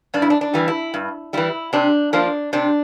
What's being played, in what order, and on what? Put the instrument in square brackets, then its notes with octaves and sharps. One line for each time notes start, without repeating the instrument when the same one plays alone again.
[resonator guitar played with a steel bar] G2 D4
E4
D4
D4
E3 G3
E4
G2
E3 G3 E4
C3 D4
F3 A#3 D4
C3 D4